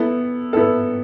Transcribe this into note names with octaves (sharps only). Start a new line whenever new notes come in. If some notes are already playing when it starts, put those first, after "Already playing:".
Already playing: B3 E4 A4
B3 E4 A4